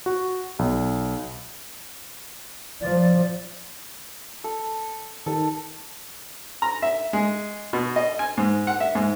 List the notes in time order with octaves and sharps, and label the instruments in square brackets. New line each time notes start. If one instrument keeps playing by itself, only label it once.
[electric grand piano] F#4
B1
[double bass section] F3 [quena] D5
[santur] A4
[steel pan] D#3 [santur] A4
[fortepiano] A#5
E5
G#3
B2
D#5
G#5
G#2
F#5
E5
G#2